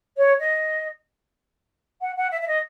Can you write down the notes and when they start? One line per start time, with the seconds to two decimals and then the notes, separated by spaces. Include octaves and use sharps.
0.17 C#5
0.39 D#5
2.01 F#5
2.16 F#5
2.31 E5
2.41 E5
2.47 D#5